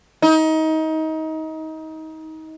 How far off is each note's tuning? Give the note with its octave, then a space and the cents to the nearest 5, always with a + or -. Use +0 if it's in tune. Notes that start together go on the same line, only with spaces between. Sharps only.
D#4 +25